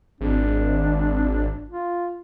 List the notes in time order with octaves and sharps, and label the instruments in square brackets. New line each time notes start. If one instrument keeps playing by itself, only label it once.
[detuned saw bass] G#1 [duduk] D4
[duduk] F4